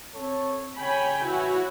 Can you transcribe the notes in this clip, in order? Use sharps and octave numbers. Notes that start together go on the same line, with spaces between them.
C4 A4 C#5
C#3 C#5 G5 G#5 B5
A1 E4 F#4 B4 C#5 G#5